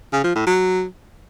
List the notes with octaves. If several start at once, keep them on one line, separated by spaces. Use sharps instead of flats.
C#3
F3
A2
F#3